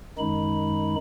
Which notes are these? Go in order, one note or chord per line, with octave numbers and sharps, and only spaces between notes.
F#2 D#3 G#3 D#4 B5